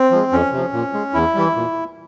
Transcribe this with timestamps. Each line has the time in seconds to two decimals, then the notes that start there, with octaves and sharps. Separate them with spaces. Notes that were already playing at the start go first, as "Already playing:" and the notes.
Already playing: C4
0.11 F3 G#3
0.32 F2 C#4
0.52 C3 F3
0.73 A#2
0.93 G#3
1.14 E2 E4
1.35 E3 G3
1.56 A#2